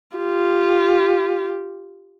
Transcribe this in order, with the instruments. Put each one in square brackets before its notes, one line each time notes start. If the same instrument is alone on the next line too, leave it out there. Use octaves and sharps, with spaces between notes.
[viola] F4 G4